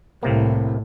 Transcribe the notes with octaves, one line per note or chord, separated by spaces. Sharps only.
C2 A2 C3 A#3